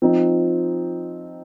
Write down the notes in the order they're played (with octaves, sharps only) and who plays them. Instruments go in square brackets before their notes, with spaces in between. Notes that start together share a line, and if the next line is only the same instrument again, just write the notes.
[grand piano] F3 C4 D#4